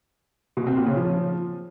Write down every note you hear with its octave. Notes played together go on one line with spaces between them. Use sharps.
B2
C4
A#2
C#3
F3